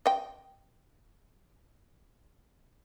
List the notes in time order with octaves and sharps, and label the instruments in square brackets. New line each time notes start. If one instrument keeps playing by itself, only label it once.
[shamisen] D#5 G5